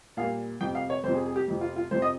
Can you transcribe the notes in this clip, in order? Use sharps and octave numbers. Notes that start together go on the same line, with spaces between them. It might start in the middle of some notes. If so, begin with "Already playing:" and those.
A#2 G3 A#3 F5
F2 C3 F3 G5
F5
C#5
F2 C3 F3 C5
G#4
G#4
G4
F2 C3 F3
F4
F4
F2 C3 F3 C5
D#5